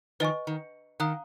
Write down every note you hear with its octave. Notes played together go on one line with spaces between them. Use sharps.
D#3 F3 B4 D#5 G#5 C#6
D#3
D#3 F5 A#5 D#6 F#6